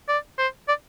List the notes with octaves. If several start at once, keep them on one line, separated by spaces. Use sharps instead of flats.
D5
C5
D5